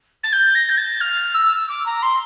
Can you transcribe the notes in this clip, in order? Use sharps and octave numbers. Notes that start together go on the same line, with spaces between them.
A6
G6
A#6
G6
A6
F6
E6
D6
A#5
C6